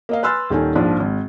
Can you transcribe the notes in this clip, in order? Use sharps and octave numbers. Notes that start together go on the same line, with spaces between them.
A#3 D#5 F5
B4 G#5 C6 E6 F6 A6
D#1 D#3 A4 G#5
A#1 G#2 F3 D4
G#1